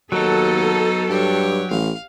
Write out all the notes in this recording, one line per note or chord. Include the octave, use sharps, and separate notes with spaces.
D#2 F#3 B3 D#4 A4
G2 G4 C#5
A1 F5